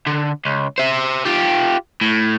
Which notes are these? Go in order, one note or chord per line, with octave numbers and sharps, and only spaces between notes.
D3
C#2
C5 E5
F4 G4
A2